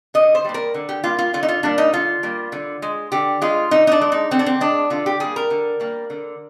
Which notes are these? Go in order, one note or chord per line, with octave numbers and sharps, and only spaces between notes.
D3 D#5
C5
G3 A#3
A#4
D3
G4
G3 A#3 F4
F4
D3 F4
D#4
F4
G3 A#3 D4
D#4
D3 F4
G3 A#3
D3
G#3
D3 G4
G#3 F4
D3 D#4
D#4
D4
G#3
D#4
D3 C4
D4
C4
G#3 D4
D3 F4
G4
G3 A#3 G#4
A#4
D3
G3 A#3
D3